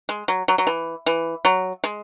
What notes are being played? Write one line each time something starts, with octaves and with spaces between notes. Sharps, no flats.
G#3
F#3
F#3
F#3
E3
E3
F#3
G#3